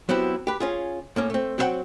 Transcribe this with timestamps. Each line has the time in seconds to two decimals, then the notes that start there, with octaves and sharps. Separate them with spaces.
0.09 F#3 B3 C4 E4 G4
0.47 G4 B4
0.60 C#4 F4 G#4
1.16 A2 A#3 C#4
1.30 A3 C4
1.58 F#3 C4 D#4 E4 F#5 G5